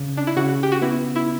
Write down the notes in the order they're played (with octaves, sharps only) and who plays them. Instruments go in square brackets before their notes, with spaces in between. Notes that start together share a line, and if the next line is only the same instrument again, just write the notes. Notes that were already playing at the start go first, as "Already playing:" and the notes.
Already playing: [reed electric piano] C#3
[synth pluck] D4
E4
[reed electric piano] C#3 [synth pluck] F#4
[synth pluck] G4
F#4
[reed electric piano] B3 [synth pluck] E4
[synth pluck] E4